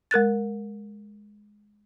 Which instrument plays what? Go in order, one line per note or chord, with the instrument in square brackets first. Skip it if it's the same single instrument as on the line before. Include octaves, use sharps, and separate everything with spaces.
[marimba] G#3 A#4 F#6 A6